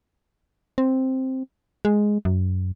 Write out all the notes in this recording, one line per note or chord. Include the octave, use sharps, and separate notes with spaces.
C4
G#3
F#2